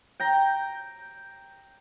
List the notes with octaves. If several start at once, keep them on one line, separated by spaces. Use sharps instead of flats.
G5 A#5